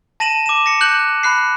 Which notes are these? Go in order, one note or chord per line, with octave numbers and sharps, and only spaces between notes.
A5 A#6 D#7 E7 F#7
D6 E7
A#6 C#7
F#6 G6 F#7
B5 F#6 C7